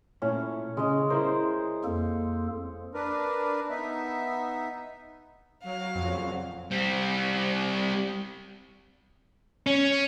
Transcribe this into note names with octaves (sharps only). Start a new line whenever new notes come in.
A#2 A3 C#4 E4
C#3 G#3 D#5
E4 A#4 C5
F2 A#3 A4
D4 A#4 B4
B3 D#4 E5
F#3 F5
F2 A#2 C#3 F#4
G3 C4
C#4